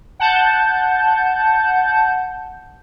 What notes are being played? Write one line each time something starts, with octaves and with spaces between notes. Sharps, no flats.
F#5 A5 G6